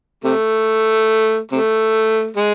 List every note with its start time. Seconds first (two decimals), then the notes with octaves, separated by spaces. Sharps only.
0.24 C3 A3
1.51 C3 A3
2.36 G#3